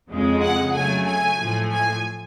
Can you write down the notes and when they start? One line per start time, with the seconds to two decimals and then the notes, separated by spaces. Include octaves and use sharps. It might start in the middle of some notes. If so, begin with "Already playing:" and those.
0.10 F2 C#3 G#3
0.42 F#5
0.74 C#3 F#3 A3 G#5
1.06 G#5
1.39 A2 F3 A3
1.72 G#5